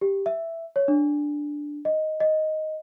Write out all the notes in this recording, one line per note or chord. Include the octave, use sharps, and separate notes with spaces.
G4
E5
C#5
D4
D#5
D#5